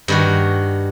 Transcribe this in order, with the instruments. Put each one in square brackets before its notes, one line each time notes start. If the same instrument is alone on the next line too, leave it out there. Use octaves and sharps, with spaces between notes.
[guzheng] G2 D#3 F#4